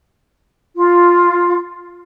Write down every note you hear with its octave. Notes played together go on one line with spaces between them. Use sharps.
F4